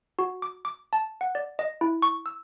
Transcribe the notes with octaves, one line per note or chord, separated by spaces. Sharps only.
F#4
D6
D6
A5
F#5
D5
D#5
E4
C#6
E6